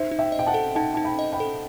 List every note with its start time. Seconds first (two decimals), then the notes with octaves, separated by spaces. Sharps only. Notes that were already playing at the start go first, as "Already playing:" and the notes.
Already playing: D#4 C5 E5
0.11 D#4
0.19 E5 G5
0.32 D#5
0.39 G5
0.46 F#5 A5
0.54 A4
0.75 D#4 F#5 A5
0.94 D#4 A5
1.04 G5 B5
1.19 D#5
1.33 G5 B5
1.40 A4